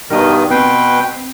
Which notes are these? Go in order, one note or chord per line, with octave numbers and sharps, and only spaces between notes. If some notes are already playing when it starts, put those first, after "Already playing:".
G2 B2 D#3 A#4 D#5
B2 C4 B4 G5